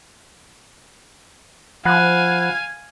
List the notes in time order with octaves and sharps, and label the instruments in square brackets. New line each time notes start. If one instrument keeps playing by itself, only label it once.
[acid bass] F3 [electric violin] F5 G#5 [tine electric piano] F#5 B5 F#6